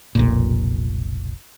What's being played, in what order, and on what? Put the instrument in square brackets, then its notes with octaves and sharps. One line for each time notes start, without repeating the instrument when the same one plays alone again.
[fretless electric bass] F1 B1 A#2